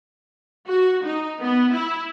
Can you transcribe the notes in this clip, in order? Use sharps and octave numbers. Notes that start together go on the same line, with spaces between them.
F#4
D#4
B3
E4